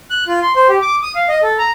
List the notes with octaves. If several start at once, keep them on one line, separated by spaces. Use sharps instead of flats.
F#6
F4
C6
C5
G4
D6
D#6
F5
D#5
A4
A#5